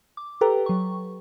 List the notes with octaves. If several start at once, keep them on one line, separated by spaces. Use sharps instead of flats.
D6
G4 A4 B4 G5 A#5
F#3 C#6